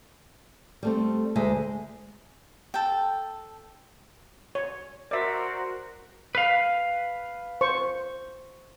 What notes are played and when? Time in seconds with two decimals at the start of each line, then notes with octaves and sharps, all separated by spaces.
0.83 G3 A3 C4
1.36 D2 G#3 E5
2.74 A4 G5
4.55 C#5
5.11 F#4 A#4 C5 D5 E5
6.35 B4 F5
7.61 C5 C#6